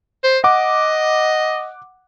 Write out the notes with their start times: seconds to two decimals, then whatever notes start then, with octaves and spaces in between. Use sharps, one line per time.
0.24 C5
0.44 D#5 F#5 D6